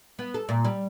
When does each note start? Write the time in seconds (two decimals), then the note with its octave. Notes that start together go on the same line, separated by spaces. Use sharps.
0.19 B3
0.34 A4
0.49 A#2
0.65 G3